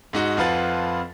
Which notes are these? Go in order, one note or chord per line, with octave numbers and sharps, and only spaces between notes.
G#2 D#4 F#4
F2 F3 F4 B4 F#5 A6